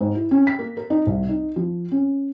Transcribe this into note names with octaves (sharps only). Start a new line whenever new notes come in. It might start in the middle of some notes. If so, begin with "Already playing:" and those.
G#2
E4
C#4
B6
A#3
A#4
D#4
C2
D#4
F3
C#4